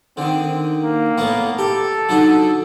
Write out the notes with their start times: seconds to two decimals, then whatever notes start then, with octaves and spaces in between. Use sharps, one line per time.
0.17 D3 D#3 C4
0.83 A#3
1.18 A2 A3 B3
1.58 G4 A4
2.09 D3 F#3 D#4